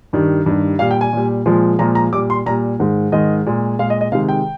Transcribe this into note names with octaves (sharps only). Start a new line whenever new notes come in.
G2 D#3 G3
G2 D#3 G3
A#2 G3 F5
G5
G#5
A#2 G3
A#2 F3 G#3
A#2 F3 G#3 A#5
A#5
A#2 G3 D6
C6
A#2 G3 A#5
G#2 D#3 G#3
G#2 D#3 G#3 D#5
A#2 G#3
A#2 G#3 F5
D#5
D#5
C3 D#3 G#3 F5
G5